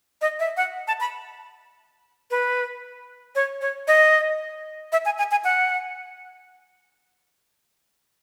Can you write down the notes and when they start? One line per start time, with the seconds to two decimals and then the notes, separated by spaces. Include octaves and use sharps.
0.22 D#5
0.39 E5
0.57 F#5
0.88 A5
1.00 B5
2.31 B4
3.35 C#5
3.61 C#5
3.88 D#5
4.92 E5
5.05 G#5
5.18 G#5
5.31 G#5
5.44 F#5